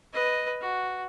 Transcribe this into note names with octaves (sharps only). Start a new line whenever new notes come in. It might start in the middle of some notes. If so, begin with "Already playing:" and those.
B4 D#5
F#4